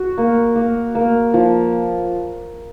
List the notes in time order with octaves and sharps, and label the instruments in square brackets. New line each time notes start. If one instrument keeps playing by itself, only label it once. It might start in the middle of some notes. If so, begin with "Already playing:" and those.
Already playing: [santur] F#4
A#3
A#3
A#3
F3